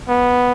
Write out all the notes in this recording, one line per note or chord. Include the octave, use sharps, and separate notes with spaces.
B3